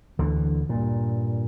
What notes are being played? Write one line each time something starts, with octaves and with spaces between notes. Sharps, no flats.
D2 D3 E3
G2 A#2